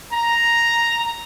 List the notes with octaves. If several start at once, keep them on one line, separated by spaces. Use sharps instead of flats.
A#5